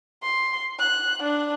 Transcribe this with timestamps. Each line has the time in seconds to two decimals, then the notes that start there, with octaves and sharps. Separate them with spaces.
0.23 C6
0.79 F#6
1.23 D4